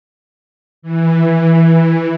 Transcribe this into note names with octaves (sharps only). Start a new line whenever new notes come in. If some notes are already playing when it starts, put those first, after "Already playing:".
E3